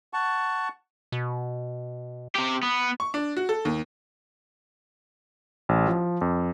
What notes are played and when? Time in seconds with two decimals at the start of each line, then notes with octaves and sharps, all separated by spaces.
0.13 F#5 A5 C#6
1.12 B2
2.36 C3 G4
2.63 B3
3.00 C#6
3.14 D4
3.37 F#4
3.49 A4
3.65 D#2
5.69 A1
5.88 F3
6.21 F2